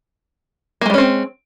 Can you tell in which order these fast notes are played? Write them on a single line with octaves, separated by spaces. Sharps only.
A#3 G#3 G3 C#4 C4